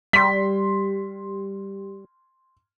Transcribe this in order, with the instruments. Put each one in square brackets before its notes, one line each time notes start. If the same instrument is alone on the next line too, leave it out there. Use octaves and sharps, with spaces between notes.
[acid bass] G3 [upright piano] C6 B6